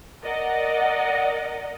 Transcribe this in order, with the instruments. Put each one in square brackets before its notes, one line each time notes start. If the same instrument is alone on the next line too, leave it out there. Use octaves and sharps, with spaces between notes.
[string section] A#4 D5 D#5 F#5